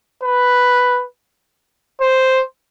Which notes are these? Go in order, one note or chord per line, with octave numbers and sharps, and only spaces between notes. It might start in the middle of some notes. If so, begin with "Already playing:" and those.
B4
C5